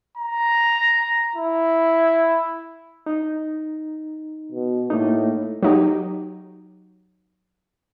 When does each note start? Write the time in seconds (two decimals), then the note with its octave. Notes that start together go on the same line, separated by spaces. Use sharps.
0.17 A#5
1.36 E4
3.06 D#4
4.52 B2
4.90 A2 A3 A#3 D#4
5.63 F#3 D#4 G4